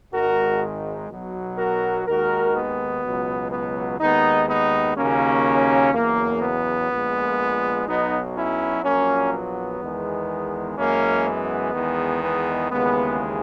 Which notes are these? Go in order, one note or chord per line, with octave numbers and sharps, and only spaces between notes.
G#1 G#2 D#3 G#3 F#4 A#4
B1 B2 F#3
F#4 A#4
D#2 D#3 G#3 F#4 A#4
B3
C#2 B2 F#3
B3
D#2 D#3 G#3 B3 D#4
B3 D#4
D#2 C#3 F#3 A#3 C#4
E2 C#3 F#3 A#3
B3
A#1 A#2 G#3
B1 B2 F#3 B3 D#4
C#4 E4
A#1 A#2 F#3 A#3 C#4
B3
E2 D#3 G#3
F#2 E3 G#3 A#3 C#4
B3
E2 D#3 G#3
B3
D#2 C#3 E3 G#3 B3